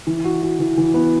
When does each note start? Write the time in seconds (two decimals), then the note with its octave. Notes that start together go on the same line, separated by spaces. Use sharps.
0.07 E3
0.24 F#4
0.43 F#4
0.59 E3
0.77 E3
0.94 B3